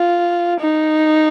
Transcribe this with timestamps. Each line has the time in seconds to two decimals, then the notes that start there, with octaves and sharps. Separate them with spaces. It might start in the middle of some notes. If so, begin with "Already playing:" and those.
Already playing: F4
0.60 D#4